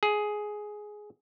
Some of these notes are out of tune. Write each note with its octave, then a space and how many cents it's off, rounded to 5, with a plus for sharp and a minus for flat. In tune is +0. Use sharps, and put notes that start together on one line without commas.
G#4 +10